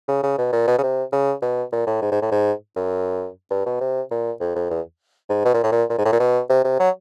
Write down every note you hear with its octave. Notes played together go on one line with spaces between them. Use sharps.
C#3
C#3
B2
A#2
B2
C#3
C3
C#3
B2
A#2
A2
G#2
G#2
A2
G#2
F#2
G2
B2
C3
A#2
F2
F2
E2
G#2
B2
A#2
A2
A#2
A#2
G#2
A2
A#2
B2
C3
C3
F#3